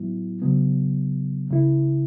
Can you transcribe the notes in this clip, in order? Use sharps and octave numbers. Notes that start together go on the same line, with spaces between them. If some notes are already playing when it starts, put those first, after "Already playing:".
Already playing: A2 F#3 B3 E4
C#3 F#3 B3
C#2 C#3 A3 E4